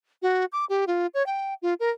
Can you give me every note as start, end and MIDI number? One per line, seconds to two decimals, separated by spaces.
0.22 0.45 66
0.52 0.65 86
0.69 0.85 67
0.87 1.07 65
1.14 1.25 73
1.26 1.54 79
1.62 1.74 65
1.80 1.90 70